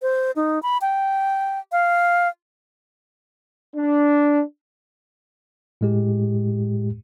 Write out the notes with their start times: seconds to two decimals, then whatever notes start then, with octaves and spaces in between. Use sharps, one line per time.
0.02 C5
0.36 D#4
0.63 B5
0.81 G5
1.72 F5
3.76 D4
5.81 A2 G#3 G4